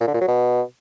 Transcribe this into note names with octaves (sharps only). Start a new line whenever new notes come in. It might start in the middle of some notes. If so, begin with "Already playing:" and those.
A#2
D3
A#2
F#3
B2